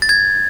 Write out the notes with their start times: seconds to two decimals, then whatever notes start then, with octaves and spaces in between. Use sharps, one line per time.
0.02 A6
0.09 G#6